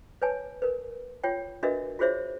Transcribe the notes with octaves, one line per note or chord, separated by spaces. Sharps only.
B4 C#5 G#5 A5
A#4 B4
F4 C#5 G5
D4 F#4 A#4 B4 D#5 E5
F4 F#4 G#4 C5 C#5 E5